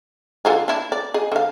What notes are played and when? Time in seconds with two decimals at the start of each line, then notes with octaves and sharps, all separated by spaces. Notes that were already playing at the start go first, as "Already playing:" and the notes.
0.45 D3 F4 G#4
0.68 D4 E4
0.92 D5
1.14 G#4 D#5
1.32 D3 F5